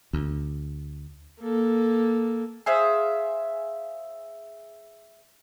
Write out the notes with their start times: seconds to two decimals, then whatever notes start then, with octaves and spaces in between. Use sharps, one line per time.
0.13 D2
1.41 A#3 A4
2.66 G#4 C5 E5 F5